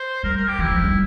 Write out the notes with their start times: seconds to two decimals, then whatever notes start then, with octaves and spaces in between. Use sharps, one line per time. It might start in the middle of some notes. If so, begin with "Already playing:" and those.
Already playing: C5
0.23 G3 A#4
0.36 A#4
0.48 G4
0.59 E3 E4
0.71 F3
0.84 G3